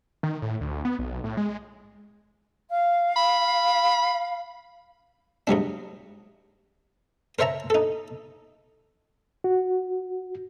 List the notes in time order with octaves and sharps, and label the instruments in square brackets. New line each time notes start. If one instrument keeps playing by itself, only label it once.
[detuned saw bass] D#3
A2
D2
B3
B1
A2
G#3
[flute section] F5
[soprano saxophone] B5
[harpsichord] G#2 F#3 G3 D4
A#4 C5 C#5 E5 A5 A#5
D#4 A4
[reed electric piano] F#4